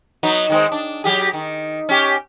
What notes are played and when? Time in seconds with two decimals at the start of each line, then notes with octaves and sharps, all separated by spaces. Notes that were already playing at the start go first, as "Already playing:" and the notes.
0.23 F#3 B3 D#4
0.50 D#3 G#3 C4
0.72 D4
1.04 F#3 G4 G#4
1.33 D#3
1.89 C#4 G4